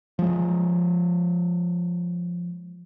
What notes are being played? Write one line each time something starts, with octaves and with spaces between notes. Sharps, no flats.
F3 G#3